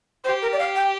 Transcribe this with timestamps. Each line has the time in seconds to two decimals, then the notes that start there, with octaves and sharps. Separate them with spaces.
0.24 G4 C5
0.42 A#4
0.53 D5
0.59 F5
0.75 G5